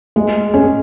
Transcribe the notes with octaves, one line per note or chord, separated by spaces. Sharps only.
G#3
C#4 G#4 C#5